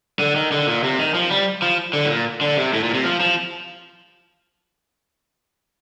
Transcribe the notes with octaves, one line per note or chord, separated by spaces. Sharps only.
D3
D#3
D3
A#2
C3
D#3
F3
G3
F3
D3
A2
A#2
D3
C3
A2
A#2
C3
F3
F3